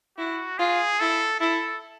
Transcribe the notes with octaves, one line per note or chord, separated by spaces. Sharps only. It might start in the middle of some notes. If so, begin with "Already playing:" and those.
E4 F#4
F4 G#4
E4 A4
E4 A4